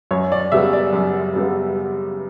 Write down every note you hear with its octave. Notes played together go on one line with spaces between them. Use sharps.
F#2 C#5
D5
C#3 G3 B3 E5
D5
F#2
C#3 G3 B3